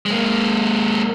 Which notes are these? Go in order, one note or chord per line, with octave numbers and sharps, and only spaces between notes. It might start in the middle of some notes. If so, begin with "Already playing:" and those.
G#3 A#3